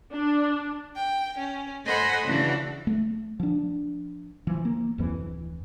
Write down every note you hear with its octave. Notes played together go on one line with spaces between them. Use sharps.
D4
G5
C#4
A4 C5 D#5 F#5 G#5 B5
C#3 E3 D4 F#4
A3
F3 D4
E3 F3
A#3
D1 F2 E3